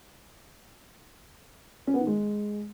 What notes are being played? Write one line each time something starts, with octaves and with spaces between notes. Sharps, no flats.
C#4
B3
D#3
G#3